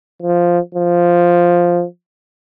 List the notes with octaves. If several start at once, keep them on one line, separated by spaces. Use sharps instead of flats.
F3
F3